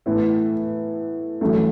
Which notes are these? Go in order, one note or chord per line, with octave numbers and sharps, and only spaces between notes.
A2 E3 B3 E4 B4
A1 G2 F#3 A3